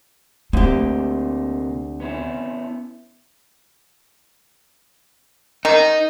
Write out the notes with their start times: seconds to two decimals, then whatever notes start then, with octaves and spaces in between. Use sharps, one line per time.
0.53 D2 C3 A#3 C4 G4
2.00 B3 C#4 E4
5.65 D#3 D#4